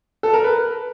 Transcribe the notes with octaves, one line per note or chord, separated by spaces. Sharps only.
A4
A#4
B4